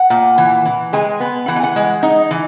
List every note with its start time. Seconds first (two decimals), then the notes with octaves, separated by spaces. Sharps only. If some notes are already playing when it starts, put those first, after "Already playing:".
Already playing: F#5
0.10 A#2
0.38 E3
0.65 E3
0.93 G#3 G#5
1.20 B3
1.48 E3 F#5
1.56 G#5
1.63 F#5
1.76 G#3
2.03 D#4
2.31 E3